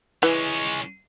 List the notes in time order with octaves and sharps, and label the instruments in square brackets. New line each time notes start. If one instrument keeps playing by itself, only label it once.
[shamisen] E3 [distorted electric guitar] G#3 C#4